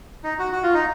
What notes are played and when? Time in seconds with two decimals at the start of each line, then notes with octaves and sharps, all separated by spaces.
0.24 D#4
0.39 F#4
0.52 F#4
0.63 F4
0.74 D#4